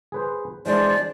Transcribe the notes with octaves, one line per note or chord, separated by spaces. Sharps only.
G#4 B4 C5
E3 G#3 D4 C5 D5